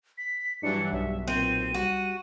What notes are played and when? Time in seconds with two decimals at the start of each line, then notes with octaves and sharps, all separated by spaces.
0.18 B6
0.63 G2 E3 F#3 D4 C#7
0.92 B1 E5
1.28 A#2 C4 D#7
1.74 G3 F#4